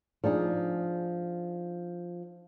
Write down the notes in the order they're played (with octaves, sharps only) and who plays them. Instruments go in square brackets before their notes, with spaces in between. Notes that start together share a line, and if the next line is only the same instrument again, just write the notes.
[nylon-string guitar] F3 D4 D#4 G#4